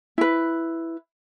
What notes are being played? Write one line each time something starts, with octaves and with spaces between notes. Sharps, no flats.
E4 B4